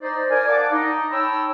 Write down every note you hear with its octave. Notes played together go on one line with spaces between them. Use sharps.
D#4 C5 D5 D#5
A#4 D5 G#5
D5 F5 F#5 A5 D6
D#4
C#5 G5 A5 B5 E6